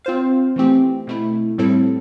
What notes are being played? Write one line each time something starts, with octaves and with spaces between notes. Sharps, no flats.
C4 F4 C5 F5
E3 A3 C4 G4
B2 A3 E4
A2 G3 C4 E4 A4